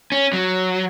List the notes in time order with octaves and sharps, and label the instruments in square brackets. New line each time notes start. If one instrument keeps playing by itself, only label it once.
[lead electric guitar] C#4
F#3